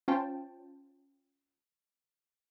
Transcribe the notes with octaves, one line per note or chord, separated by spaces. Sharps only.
C#4 F4 C5 G5 A5